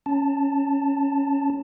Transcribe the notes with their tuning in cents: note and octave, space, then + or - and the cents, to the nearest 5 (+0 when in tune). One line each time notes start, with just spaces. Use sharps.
C#4 +0 A5 +5